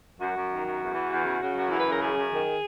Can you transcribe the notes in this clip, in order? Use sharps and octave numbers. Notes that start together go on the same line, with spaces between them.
F#2 F#4
F#2
D#3
F#2
E2
E3
E2
C#3
C#3
F#2
E3
B4
C#3 A#4
F#2 G#4
F#2
D#3